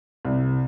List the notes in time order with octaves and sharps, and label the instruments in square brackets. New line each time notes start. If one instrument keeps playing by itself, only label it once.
[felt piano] C2